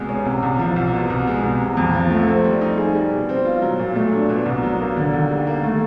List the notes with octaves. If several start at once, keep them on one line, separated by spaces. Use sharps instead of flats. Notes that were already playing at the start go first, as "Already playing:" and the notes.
Already playing: C2 B2 G#3
C#4
C3
C2
F3
C2
B2
C2
G#3
C2
C3
F2
F3
A3
C4
G3
D#4
G#4
G3
B2
C4
F4
F#3
A#2
A3
D4
B2
C2
F#3
A#3
D3
D#2
G3
A#3
A3